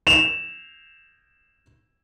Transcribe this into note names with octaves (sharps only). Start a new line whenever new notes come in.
E7 F7